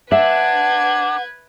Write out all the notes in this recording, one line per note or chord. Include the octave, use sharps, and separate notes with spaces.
D4 B4 E5 F#5 G#6